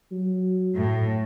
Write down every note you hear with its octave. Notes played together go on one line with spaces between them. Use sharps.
F#3
A2